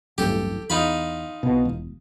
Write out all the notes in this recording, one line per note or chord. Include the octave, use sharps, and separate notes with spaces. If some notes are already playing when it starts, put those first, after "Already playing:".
D1 A1 G2 G4 A4
E2 D#4 F4 B5
C2 B2
E1